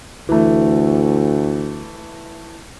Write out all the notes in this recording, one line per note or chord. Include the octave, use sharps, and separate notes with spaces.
D2 E3 A3